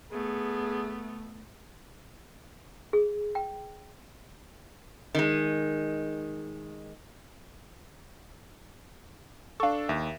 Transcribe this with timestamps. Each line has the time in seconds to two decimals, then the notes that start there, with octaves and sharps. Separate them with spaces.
0.12 A3 B3 G#4
2.93 G#4
3.35 G5
5.15 D#3 G#3
9.60 D4 A4 F5 C#6
9.89 D#2 E5